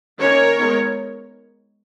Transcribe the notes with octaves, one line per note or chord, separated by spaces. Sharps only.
D#3 A#3 C#4 A#4 C#5
G#3 B3 D#4